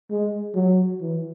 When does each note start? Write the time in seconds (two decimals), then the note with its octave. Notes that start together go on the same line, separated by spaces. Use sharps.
0.11 G#3
0.55 F#3
1.01 E3